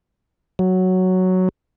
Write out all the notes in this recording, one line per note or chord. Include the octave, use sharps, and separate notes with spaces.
F#3